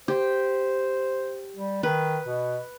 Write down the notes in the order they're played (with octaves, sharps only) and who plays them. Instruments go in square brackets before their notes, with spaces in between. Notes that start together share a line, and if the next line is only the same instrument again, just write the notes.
[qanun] G4 [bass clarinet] C5
[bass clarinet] G3
[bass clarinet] D#3 [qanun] B4
[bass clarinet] B2